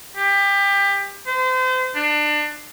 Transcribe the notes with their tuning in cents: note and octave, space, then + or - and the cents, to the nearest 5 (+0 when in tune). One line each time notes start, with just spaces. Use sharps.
G4 +25
C5 -35
D4 +25